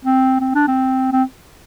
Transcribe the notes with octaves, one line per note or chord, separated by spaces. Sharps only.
C4
C4
D4
C4
C4